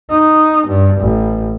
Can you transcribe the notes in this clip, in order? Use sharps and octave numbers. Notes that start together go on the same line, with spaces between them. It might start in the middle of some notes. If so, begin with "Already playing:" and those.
D#4
G2
A1